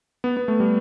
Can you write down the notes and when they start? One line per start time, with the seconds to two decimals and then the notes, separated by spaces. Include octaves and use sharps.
0.24 B3
0.37 B3
0.48 A3
0.60 G3